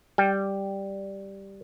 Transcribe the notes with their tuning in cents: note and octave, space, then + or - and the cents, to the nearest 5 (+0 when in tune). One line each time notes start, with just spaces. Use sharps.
G3 +0 G5 +0